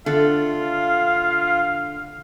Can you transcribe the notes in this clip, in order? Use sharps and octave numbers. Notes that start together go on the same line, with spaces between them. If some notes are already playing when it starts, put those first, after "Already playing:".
D3 A3 D4 F4 A4 F5